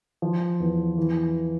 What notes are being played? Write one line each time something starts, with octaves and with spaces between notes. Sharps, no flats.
F3
E2
E3